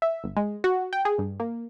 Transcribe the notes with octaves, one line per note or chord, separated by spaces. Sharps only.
E5
G1
G#3
F#4
G5
G#4
G2
A#3